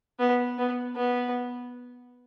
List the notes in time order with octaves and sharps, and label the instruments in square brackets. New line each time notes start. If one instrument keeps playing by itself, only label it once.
[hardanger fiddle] B3
B3
B3